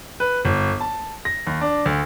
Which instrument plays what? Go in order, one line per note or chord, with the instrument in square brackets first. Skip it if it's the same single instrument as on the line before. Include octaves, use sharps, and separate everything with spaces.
[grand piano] B4
G1
A5
A#6
D#2
D4
D2